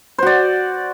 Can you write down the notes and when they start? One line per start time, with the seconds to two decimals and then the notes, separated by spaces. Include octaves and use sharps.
0.18 C5
0.23 F#4
0.27 D5